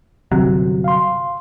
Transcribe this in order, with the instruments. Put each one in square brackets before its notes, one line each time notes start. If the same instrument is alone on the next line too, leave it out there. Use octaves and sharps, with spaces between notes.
[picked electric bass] G1 C3 F#3
[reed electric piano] F5 C6